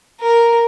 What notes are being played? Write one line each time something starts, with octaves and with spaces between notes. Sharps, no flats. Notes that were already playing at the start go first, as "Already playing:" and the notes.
A#4